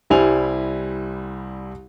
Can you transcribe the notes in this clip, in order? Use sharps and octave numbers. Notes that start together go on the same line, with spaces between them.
C2 G3 E4 C5 G#5 F7